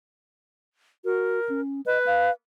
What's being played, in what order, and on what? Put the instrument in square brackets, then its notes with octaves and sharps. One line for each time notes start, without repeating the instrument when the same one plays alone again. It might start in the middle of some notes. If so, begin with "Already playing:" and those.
[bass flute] F#4 [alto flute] A#4
[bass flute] C#4
[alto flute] B4 [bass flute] D#5
[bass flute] F5